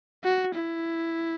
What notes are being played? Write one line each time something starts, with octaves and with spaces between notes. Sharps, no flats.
F#4
E4